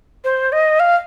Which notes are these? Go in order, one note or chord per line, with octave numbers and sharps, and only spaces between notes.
C5
D#5
F5